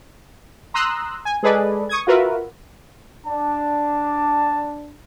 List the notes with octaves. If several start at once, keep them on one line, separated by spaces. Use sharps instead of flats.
A#5 C6 D#6 E6 F#6
G#5
G#3 G#4 A4 B4 D5 D#5
C#6 D#6 G#6
F4 F#4 A#4 B4 E5
D4 A5